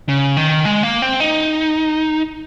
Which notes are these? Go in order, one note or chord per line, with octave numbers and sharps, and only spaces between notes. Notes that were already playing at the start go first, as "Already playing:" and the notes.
C#3
D#3
G#3
A#3
C4
D#4